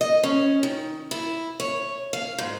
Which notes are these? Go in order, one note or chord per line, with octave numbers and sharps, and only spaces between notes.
D#5
C#4
D#3
E4
C#5
F5
G#2